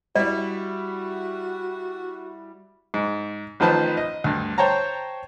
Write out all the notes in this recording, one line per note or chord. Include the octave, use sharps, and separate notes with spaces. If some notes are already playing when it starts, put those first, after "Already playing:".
G3 E4 F#4 D5
G#2
A1 D#3 F3 B4 C5 A5
D#5
D2 G2
C5 C#5 G5 A5 A#5